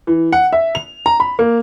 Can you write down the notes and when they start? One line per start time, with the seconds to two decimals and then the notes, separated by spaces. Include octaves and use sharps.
0.07 E3
0.32 F#5
0.53 E5
0.75 F7
1.06 A#5
1.20 B5
1.39 A#3